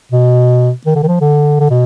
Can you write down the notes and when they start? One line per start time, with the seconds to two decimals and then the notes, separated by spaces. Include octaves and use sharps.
0.12 B2
0.86 D#3
0.95 D3
1.03 D#3
1.08 F3
1.21 D3
1.60 D3
1.70 B2